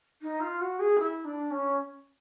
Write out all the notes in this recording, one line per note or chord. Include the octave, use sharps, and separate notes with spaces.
D#4
F4
F#4
G#4
E4
D4
C#4